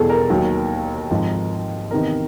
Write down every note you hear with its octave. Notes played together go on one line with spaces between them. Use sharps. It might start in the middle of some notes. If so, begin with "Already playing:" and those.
Already playing: E1 E2 E3 G3 G#4 A4
A#4
D#2 D#3 F#3
G#1 G#2 F3
E2 C3 D#3 A#4